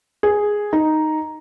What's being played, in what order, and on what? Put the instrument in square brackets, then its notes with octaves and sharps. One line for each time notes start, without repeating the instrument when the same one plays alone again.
[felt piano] G#4
D#4